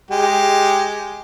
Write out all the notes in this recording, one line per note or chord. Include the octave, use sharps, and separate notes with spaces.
G#3 G4